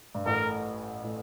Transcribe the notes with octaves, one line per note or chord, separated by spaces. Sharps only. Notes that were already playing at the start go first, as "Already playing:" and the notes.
G2
A1 A2 A#4
A2